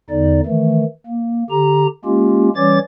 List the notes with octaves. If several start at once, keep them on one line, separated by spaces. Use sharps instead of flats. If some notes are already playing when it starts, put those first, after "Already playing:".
E2 D3 D#4 D5
D#3 E3 A3
A#3
D3 G4 A#5
G#3 A#3 C#4 F4 G4
E3 G3 C#4 C#5 D6 A6